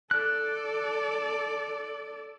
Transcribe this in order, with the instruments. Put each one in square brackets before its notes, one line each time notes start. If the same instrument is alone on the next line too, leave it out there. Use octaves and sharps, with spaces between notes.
[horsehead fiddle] A4 D5 [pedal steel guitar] F#6